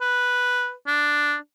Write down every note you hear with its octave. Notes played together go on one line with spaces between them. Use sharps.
B4
D4